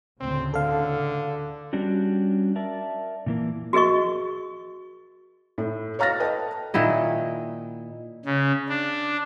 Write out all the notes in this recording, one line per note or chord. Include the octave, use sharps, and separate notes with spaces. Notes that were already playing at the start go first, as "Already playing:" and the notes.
D2 A2 C#3 C4
D3 A4 F5
G3 C#4 D4 F#4 G4
A#4 D5 E5 A5
A#2 E3 A#3
F#4 G#4 A#4 D#5 C#6
A2 E4
C#5 F5 A#5 F6 A6 A#6
A4 B4 D#5 G5 A5
A#2 D#3 E4 D#5
C#3
D4